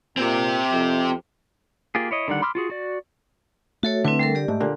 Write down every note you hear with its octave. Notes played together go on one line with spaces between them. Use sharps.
A#2 C4 G4
F2
A#3 F4 G4 G#4
E4 C#5 D#5
D3 D#3 G3 F#5
B5 C6 D6 E6 F6
F4 F#4 G#4
F#4 D5
A3 F#4 A4 C#5
D3 C4 E4 B4
G3 A4 A#4
G4 D5
G#2 A3
A#2 D3 A#3